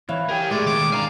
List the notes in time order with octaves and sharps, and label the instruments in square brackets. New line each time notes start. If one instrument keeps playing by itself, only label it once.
[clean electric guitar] E3 [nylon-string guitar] C#5 E5 F5
[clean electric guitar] G4 [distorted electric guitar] A#4 G5 [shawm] G#5
[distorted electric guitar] A2 [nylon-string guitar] G#3 A3 E5 [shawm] D5
[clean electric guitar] D#2 B2 [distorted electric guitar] D#3 [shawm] D6
[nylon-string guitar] D4 [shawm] F5 [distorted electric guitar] G#5 A#5